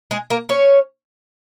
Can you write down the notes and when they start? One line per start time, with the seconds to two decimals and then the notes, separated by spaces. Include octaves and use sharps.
0.11 G#3 G#4
0.30 A#3 A#4
0.49 C#4 C#5